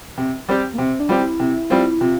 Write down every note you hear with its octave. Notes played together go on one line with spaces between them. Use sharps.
C3
G3 C4 G4
A#3
C3 C4
D4
G3 C4 F4 G4
E4
C3
G3 C4 F4
C3 F4